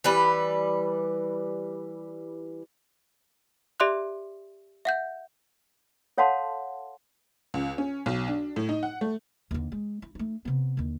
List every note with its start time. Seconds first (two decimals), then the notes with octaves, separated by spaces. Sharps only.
0.04 E3 G3 B4
3.80 G4 D5 E5 C6 D6 F#6
4.85 E5 F#5 G6
6.18 A4 C#5 F5 F#5 A5 C6
7.54 C#2
7.78 C#4
8.06 B1
8.28 D4
8.56 A2
8.69 D#4
8.83 F#5
9.01 A3
9.51 D#2 D3
9.72 G#3
10.02 E4
10.15 A3 D#4
10.45 C3 B3
10.77 D#2 D3